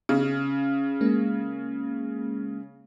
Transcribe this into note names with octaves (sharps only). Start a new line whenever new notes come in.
C#3
G#3 A#3 C#4